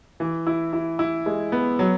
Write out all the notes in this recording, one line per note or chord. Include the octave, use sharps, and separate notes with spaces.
E3
E4
E4
E4
G#3
B3
F#3